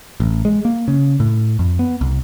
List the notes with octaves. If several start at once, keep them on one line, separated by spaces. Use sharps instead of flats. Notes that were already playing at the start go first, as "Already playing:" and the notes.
A1
G#3
A#3
C#3
A2
F2
B3
C2